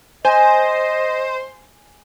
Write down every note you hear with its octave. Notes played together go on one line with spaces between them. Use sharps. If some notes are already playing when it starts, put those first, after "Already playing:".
C5 D#5 G#5